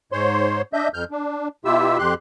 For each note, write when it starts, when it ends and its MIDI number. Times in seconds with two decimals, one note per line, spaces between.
0.12 0.62 44
0.12 0.62 72
0.12 0.62 73
0.12 0.62 84
0.73 0.88 62
0.73 0.88 75
0.73 0.88 76
0.73 0.88 91
0.94 1.04 41
0.94 1.04 89
0.94 1.04 91
1.11 1.48 62
1.65 1.98 47
1.65 1.98 64
1.65 1.98 65
1.65 1.98 67
1.65 1.98 76
1.65 1.98 88
1.99 2.14 41
1.99 2.14 67
1.99 2.14 84
1.99 2.14 90